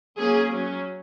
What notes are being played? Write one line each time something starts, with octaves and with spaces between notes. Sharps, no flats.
F#3 A#3 C#4 G#4
F#3 C#4